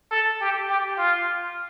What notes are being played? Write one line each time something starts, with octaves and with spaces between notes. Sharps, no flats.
A4
G4
G4
F4